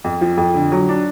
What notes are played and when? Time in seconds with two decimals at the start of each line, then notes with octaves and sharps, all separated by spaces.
0.04 F2
0.21 F3
0.37 F2
0.54 D3
0.72 F#3
0.89 D4